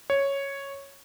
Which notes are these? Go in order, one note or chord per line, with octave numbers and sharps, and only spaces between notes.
C#5